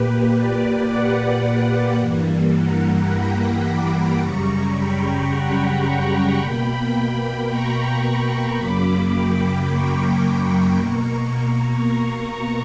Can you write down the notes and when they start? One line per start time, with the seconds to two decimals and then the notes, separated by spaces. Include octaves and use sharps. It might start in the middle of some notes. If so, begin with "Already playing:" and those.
Already playing: A#2 A#3 G4 B4
0.34 B4 D5
0.88 D5 F#5
1.99 G2 E3 G3 A#3
2.53 F#5 A#5
3.08 G5 B5
3.63 B5 D6
4.18 F#2 C#3 G3 A#5 C#6
4.73 G5 B5
5.28 F#5 A#5
5.82 G5 B5
6.37 B2 A#3 G5 B5
6.92 G5 B5
7.47 A#5 C#6
8.02 A#5 C#6
8.57 F#2 C#3 F#3 A#3 B5 D6
9.12 G5 B5
9.67 A#5 C#6
10.22 B5 D6
10.76 B2 A#3 A#5 C#6
11.31 A#5 C#6
11.86 A#5 C#6